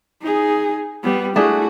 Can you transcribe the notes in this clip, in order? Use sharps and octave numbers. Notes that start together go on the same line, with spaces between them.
D#4 G#4
G3 B3
A3 D4 E4 F#4 G#4